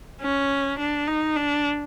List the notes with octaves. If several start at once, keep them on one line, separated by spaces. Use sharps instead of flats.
C#4
D4
D#4
D4